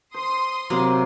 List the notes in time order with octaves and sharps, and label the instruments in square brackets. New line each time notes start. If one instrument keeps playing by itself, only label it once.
[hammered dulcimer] C5 [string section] C6 D#6
[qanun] C3 F#3 [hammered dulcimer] A#3